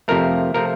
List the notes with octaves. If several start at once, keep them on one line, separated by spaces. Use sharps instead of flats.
F2 C3 F3 A3 A#4
C3 F3 A3 A#4